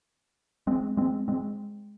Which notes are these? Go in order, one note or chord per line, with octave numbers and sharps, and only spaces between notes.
G#3 C4
G#3 C4
G#3 C4